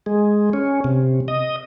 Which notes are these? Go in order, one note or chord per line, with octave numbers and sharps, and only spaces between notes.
G#3
C#4
C3
D#5